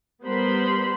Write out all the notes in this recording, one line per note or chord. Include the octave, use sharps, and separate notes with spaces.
G3 B3 A#4 C5 B5 C6